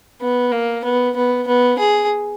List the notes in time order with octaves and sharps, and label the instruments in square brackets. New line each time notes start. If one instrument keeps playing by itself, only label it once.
[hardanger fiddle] B3
A#3
B3
B3
B3
G#4